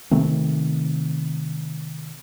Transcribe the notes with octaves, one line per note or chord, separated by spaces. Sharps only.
C3 D#3 A3 C4